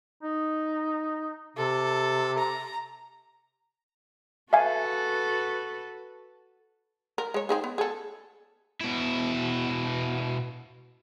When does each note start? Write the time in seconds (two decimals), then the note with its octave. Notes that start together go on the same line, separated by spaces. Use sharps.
0.23 D#4
1.57 C3 A4
2.38 A#5
4.53 F#4 A4 B4 E5 F5 G#5
7.18 A#4
7.34 G#3 C#5
7.49 C4 D#4 G#4
7.64 B3
7.78 G#4 A4
8.81 B2 E4